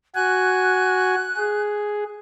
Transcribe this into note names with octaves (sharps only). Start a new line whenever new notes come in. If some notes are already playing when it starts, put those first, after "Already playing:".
F#4 G#5 F#6
G#4